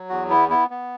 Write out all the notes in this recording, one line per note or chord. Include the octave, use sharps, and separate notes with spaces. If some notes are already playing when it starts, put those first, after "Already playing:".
Already playing: F#3
E2 F#4
B3 E4
B3 E4
B3